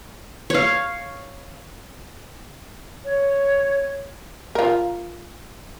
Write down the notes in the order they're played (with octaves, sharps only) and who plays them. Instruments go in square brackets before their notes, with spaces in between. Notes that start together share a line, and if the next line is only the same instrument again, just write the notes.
[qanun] C#5 F5
[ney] C#5
[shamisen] F4 A#4